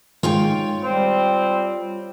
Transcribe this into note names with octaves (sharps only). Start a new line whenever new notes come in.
D#3 G#3 F4 C#5 G5
G3 C4